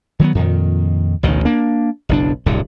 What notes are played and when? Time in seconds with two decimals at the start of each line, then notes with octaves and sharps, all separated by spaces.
0.20 D#3 F#3 G3 B3
0.35 F2 A#2 D#3
1.23 A1 D2 B2 D#3
1.45 A#3 D4
2.09 F#1 B1 D4
2.46 D1 C2 G2 D3